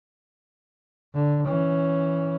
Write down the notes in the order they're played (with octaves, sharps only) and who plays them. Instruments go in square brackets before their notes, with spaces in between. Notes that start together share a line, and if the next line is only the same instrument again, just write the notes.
[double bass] D3
E3 C#4